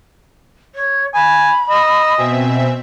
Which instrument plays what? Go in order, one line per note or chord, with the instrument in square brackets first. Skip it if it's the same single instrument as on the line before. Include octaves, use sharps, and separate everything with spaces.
[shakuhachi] C#5
[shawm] G#5 [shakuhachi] B5
[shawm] D#5 [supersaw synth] E6
[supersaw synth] B2 C4 E5 [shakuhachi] G#5